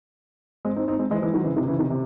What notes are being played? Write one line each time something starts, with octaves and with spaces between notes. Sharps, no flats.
G#3 C4
C4 D#4
C4 D#4
G#3 C4
E3 G#3
E3 G#3
D#3 F#3
C#3 E3
C3 D#3
C#3 E3
C3 D#3
C3